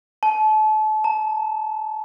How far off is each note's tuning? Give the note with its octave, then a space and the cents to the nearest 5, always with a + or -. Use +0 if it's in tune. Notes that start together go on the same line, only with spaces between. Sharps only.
A5 -35
A5 +45